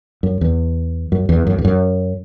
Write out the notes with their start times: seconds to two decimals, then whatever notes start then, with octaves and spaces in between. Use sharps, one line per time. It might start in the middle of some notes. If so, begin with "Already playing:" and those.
0.23 F#2
0.41 E2
1.12 F#2
1.29 E2
1.47 F#2
1.58 E2
1.65 F#2